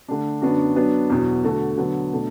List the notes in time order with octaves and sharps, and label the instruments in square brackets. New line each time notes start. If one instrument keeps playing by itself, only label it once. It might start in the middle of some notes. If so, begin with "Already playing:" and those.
[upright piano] D3 A3 D4
F#2 D3 B3 D4 F#4
F#3 B3 D4 B4
E2 B2 F#3
D3 A3 F#4 A4
D3 F#3 B3
B2 A3 D4